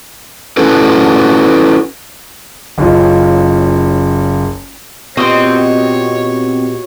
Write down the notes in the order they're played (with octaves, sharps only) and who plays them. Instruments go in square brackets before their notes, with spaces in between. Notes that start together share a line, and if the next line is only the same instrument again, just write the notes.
[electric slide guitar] C#4 E4 F#4 A4 B4
[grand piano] F#1 C#4 F4 D#5
[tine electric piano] A#2 B3 G4 [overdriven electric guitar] C4 C6 [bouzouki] F#4 D#5 [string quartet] C#5